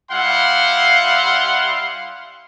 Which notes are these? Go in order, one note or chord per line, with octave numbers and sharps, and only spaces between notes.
G3 E4 F5 F#5 C6